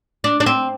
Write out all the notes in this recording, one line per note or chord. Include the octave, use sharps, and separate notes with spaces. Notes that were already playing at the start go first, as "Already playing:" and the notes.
D4
D4
C4